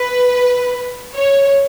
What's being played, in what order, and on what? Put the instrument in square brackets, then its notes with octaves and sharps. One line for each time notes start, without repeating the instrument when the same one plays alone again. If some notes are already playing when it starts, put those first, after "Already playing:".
Already playing: [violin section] B4
C#5